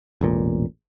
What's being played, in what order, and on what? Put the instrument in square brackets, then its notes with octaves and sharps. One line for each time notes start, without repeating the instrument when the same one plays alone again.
[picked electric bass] E1 A1 A#2